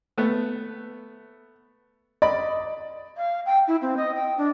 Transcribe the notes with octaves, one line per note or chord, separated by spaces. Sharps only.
A3 B3
D5 D#5 B5
F5
G5
E4
C4
D#5
G5
D4